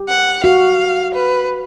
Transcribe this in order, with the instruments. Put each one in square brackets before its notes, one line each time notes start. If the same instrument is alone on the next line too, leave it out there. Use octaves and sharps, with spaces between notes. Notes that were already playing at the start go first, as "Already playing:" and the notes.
Already playing: [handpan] G4
[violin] F#5
[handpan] F#4 [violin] F5
[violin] B4